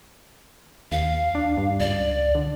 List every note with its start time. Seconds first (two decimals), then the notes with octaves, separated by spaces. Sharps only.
0.92 D#2 F5
1.35 D4
1.57 G2
1.80 C#2 D5
2.35 D3